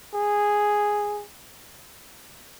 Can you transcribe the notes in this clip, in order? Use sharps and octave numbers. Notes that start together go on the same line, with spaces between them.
G#4